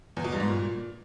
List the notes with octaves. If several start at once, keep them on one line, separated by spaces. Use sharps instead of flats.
E2
B2
G2
G#2
A#2